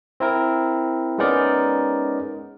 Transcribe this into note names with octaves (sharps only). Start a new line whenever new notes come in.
C4 E4 A#4
G#3 B3 C#4 D#4 A#4 D5